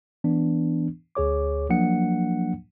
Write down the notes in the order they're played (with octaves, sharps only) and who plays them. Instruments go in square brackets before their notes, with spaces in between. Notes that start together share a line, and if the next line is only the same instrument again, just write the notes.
[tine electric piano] E3 B3 D4
D2 G#4 C#5 D6
F3 F#3 A#3 D4 F#5 C#7